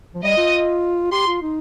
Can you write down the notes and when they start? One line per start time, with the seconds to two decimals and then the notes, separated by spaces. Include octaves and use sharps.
0.15 F3
0.23 G3 D#5
0.37 F4
1.12 G4 C6
1.27 F4
1.42 D#4